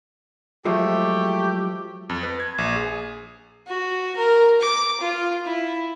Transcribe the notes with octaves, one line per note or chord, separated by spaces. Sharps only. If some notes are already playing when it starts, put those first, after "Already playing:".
F3 F#3 G#3 A3 G4
F2
B4
G#6
A#1
G#4
F#4
A#4
D6
F4
E4